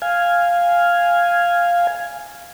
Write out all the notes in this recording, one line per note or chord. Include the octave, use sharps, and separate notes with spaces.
F5 G#5